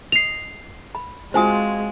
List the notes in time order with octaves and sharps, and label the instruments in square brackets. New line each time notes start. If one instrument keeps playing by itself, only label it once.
[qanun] D#5 [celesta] C7 F7
[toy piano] B5
[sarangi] G#3 [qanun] C4 F4 F#4 [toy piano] C5 G#5 D#6